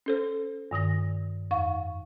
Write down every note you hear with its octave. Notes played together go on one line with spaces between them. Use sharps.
C#4 A4 C5
G2 D#3 D#6 A#6
F2 F5 C#6